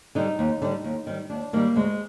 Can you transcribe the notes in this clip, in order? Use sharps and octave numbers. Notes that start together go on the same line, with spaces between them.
D3 G3 D#4
D#2
D3 G3
D#2
D#3 G3
D#2 D4
D#3 G3 A#3
D2 G#3